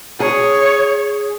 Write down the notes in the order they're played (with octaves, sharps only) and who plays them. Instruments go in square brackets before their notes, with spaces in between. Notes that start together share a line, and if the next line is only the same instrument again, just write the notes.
[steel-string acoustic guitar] G#4 [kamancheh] C#5